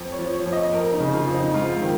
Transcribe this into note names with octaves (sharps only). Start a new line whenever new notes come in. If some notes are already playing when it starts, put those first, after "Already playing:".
Already playing: F2
C#5
F3
C#5
F2
D#5
F2 A#4
D#4
C#3
F4
F2
D#4
G#2 F4
D#3